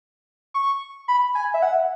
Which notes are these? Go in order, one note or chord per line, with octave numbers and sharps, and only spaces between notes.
C#6
B5
G#5
E5
F#5